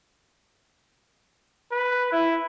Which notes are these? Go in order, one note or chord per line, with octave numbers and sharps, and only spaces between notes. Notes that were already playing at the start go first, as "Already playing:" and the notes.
B4
E4